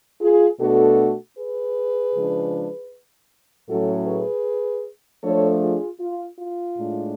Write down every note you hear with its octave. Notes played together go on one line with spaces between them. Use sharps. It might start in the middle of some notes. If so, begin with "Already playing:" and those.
F4 G#4
B2 A3 D4 F#4 A4
G#4 B4
C#3 F3 G#3 D4
A2 F#3 A3 C#4 F#4 A4
G#4 B4
F3 A3 D4 A4 C#5
F4 G#4
F4
F4
A2 G#3 D4